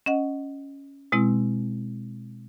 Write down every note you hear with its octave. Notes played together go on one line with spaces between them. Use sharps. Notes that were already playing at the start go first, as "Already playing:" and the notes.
C#4 D#5 F#5
B2 G#3 C4 E4